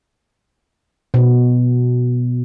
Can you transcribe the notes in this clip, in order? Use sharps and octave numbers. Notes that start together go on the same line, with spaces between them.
B2